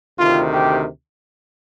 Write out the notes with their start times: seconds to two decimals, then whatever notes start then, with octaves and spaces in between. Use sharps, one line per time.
0.18 D2 C3 D#3 F4
0.52 G4